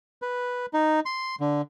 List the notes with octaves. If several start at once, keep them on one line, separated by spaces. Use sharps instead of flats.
B4
D#4
C6
D3